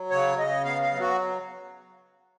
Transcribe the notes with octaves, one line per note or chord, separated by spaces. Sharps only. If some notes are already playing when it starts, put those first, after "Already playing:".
Already playing: F#3
C#3 C#5
C#3 D#5
B3 F5
F5
F#3
F#4